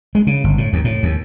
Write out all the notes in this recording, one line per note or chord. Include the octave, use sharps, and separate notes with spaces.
G#3
C#3
G1
A2
D#2
A2
D#2